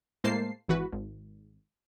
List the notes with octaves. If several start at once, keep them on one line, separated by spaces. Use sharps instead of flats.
A2 G#3 A#3 C5 A5 C7
G#1 E3 F#4 B4
G#1